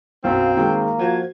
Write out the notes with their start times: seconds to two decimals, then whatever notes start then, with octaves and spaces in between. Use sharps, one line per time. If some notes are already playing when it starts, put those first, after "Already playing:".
0.24 B1 F#2 C4 F5
0.57 D#3 G#3 A#3 G5
0.99 F3 F#4 G#6